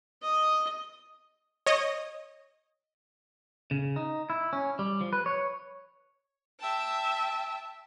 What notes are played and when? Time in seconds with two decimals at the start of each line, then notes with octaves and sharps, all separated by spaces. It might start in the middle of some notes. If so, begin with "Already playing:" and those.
0.22 D#5
1.66 C#5 D#5
3.71 C#3
3.96 D#4
4.30 E4
4.53 C#4
4.79 G3
5.01 F3
5.13 B4
5.26 C#5
6.60 E5 G5 A5